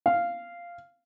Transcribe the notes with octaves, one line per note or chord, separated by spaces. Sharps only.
F5